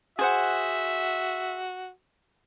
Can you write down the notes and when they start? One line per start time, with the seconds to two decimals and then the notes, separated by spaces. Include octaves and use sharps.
0.19 F#4 G#4 C5 E5 F#5